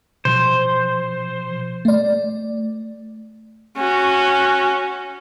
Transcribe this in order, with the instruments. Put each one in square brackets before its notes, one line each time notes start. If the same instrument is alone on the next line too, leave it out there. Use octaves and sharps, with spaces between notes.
[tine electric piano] B2 F3 [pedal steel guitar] C5
[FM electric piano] A3 D5
[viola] C#4 F#4